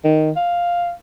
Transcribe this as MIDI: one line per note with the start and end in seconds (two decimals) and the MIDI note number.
0.04 0.31 51
0.36 0.92 77